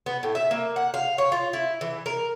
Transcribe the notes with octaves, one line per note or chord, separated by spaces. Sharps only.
B3
A2
E5
A#3
F#5
F5
C#5
F4
E4
E3
A#4